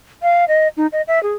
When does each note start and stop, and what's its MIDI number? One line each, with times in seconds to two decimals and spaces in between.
0.22 0.45 77
0.48 0.68 75
0.77 0.87 63
0.92 1.02 75
1.08 1.22 76
1.23 1.33 68